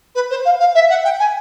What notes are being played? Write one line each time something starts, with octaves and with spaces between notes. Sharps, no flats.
B4
C5
F5
F5
E5
F#5
G5
G#5